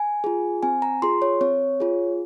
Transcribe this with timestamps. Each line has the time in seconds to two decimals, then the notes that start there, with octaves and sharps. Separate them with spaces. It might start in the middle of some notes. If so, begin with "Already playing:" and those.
Already playing: G#5
0.24 F4 G#4
0.63 C4 G#5
0.82 A#5
1.02 F4 G#4 C6
1.22 C#5
1.41 C4 C#5
1.80 F4 G#4